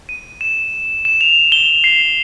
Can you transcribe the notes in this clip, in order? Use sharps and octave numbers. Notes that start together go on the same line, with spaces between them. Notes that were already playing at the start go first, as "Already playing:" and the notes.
D#7
E7
E7
F7
G7
C7